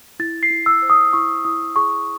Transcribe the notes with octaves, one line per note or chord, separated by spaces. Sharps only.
E4 A6
C7
E4
E6
C5
D#6
E4 C#6
E4 D#6
G#4 C#6